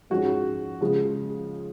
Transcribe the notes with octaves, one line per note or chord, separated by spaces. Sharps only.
G#2 F3 G#3 C#4 F#4
C#3 F3 G#3